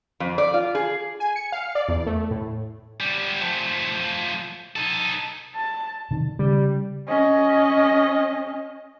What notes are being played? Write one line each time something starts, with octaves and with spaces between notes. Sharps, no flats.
F2
D5
F4
G#4
G#5
C#7
F5
D5
E2
A3
A2
D3 G3
F3 A3
D#4 A4
A5
C3 D#3
C#3 G3
C#4 D#5